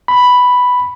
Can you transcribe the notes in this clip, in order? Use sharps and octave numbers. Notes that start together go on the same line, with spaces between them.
B5